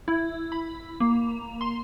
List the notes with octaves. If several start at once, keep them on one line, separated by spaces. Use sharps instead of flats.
E4
B5
A#3
C6